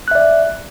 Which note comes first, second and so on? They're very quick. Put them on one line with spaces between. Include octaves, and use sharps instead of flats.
F#6 E5 D5